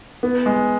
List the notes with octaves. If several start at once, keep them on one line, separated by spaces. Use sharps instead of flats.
B3
G#3